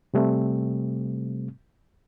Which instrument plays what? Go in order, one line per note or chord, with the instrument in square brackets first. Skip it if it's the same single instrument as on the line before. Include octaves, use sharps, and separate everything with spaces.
[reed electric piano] C3 G3 A3 C4